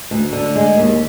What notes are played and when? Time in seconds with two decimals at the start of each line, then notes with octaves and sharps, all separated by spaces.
0.11 D2
0.33 D3
0.56 G#3
0.77 D#2